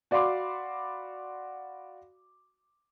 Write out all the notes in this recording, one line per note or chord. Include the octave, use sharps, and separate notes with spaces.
F#4 D5 F5 B5 C6 D6